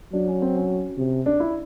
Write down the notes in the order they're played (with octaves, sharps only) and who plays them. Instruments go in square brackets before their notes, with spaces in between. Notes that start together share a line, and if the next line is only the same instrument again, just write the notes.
[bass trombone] F#3 [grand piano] D4
[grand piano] C#4
C4
C#4
[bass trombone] C3
[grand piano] D4
E4